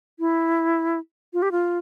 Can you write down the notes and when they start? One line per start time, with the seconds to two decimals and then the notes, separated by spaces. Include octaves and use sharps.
0.20 E4
1.33 F4
1.42 G4
1.52 F4